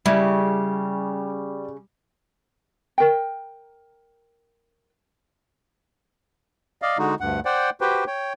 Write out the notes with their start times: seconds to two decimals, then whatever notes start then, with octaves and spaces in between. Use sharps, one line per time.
0.06 C#3 G3 E4 G4
2.98 A#4 G5
6.82 D5 D#5 F5
6.98 D3 G#3 D#4 F#4
7.20 D2 G2 F#5
7.45 C5 D5 F#5 G5
7.81 F#4 G4 B4 C5 G5
8.07 C#5 G5